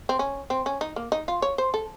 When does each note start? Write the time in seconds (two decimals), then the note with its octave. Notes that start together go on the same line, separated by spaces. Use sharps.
0.09 C4
0.19 C#4
0.50 C4
0.66 C#4
0.81 D#4
0.96 A#3
1.12 D#4
1.28 F4
1.42 C#5
1.58 C5
1.74 A4